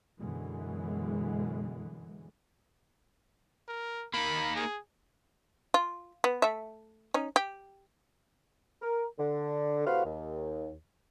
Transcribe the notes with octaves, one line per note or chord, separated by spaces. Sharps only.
F#2 B2 D3 E3 G#3
A#4
A#3 D#4 B5
G#4
F4
B3
A3 E5
C#4 D#4
G4
A#4
D3
A2 C3 F#4 B4 C5 F5
D#2